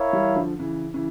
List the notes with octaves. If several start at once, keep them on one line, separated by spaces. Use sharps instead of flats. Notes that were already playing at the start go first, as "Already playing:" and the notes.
Already playing: E4 A#4 C#5 F5
E3 G3
D3 F3
C#3 E3
C#3 E3